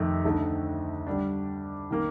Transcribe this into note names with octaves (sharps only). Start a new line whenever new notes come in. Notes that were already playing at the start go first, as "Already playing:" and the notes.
Already playing: F2 C3 D#3 A3 D#4
D2 D3 A3 D#4 A4
D3 G3 D4
D#3 A#3